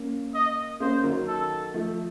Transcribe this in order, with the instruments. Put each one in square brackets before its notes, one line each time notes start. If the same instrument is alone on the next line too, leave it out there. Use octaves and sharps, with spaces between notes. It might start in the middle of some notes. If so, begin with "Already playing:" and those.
Already playing: [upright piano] A#3 C#4
[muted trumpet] D#5
[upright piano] A#3 C#4 [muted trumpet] C5
[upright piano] D#3 F#3
[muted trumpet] A4
[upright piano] F3 A3